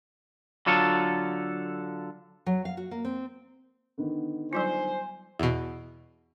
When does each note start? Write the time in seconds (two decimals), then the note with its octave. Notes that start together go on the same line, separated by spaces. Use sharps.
0.66 D3 F#3 F4 A4
2.46 F#3
2.65 F5
2.77 F#4
2.91 A#3
3.05 C4
3.98 D3 D#3 B3
4.53 F#3 G3 F4 C5 G#5
5.39 E2 B2